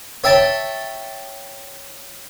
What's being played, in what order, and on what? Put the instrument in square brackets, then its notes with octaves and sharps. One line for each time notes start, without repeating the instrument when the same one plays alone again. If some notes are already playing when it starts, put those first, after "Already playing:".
[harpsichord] C#5 E5 G5 A5